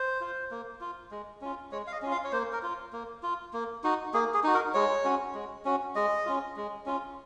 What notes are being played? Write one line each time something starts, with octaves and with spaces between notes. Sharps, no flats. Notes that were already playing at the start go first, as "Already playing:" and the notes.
Already playing: C5
F4
A#3
F4
G#3
C#4 F4
G#3 C#5
F5
D#5
C#4 F4
F5
C#5
A#3 C5
A#4
F4
A#3
F4
A#3
D#4 F#4
A#3 G#4
G#4
D#4 F#4
A#4
G#3 C#5
C#4 F#4
G#3
C#4 F#4
G#3 D#5
C#4 F4
G#3
C#4 F4